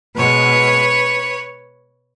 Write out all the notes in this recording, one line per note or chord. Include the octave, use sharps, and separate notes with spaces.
B2 G#3 B4 C#5